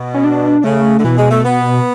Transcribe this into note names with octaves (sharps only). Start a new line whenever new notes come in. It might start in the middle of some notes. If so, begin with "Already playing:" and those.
Already playing: B2
C#4
D4
C#3 A3
D3
B2 E3
G#3
A3
B3